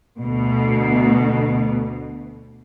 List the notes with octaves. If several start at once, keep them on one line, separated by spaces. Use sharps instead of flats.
D2 B2